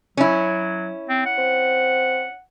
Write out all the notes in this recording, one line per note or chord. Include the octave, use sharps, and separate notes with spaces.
F#3 C#4 E4
C4
F#5
C4